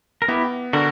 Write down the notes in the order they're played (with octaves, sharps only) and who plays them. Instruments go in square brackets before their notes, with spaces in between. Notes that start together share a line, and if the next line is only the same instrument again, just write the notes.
[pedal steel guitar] A#4
[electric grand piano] B3 [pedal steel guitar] E4 G4
[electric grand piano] D3 [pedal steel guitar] F#4 A#4